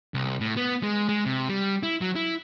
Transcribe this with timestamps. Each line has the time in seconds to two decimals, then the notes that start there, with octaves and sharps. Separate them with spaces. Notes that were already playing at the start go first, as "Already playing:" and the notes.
0.14 C2
0.40 A2
0.57 B3
0.83 G#3
1.09 G#3
1.26 C3
1.49 G3
1.83 E4
2.01 F#3
2.16 E4